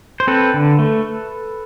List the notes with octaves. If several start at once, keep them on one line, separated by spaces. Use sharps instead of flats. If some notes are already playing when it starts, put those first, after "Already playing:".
C5
C4 A4 B4
D3
A3